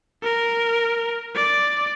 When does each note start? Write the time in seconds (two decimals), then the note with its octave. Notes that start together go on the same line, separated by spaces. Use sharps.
0.23 A#4
1.35 D5